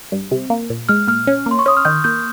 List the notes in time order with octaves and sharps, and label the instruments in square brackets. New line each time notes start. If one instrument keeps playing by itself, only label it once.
[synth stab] G2
C3
A#3
A#2
[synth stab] G#3 [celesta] F6
[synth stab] A#2 [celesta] F6
[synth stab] C#4
[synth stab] A#3 [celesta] C6
[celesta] C#6
[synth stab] C#4 [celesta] D#6
[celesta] F6
[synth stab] D#3 [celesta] G6
[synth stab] A#3 [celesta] G6